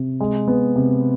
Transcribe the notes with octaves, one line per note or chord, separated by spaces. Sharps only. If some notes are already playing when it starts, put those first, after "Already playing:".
Already playing: C3
G#3
B3
C3